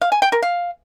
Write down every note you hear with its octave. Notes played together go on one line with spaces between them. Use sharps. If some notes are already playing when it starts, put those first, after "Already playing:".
F5
G#5
G5
A#4
F5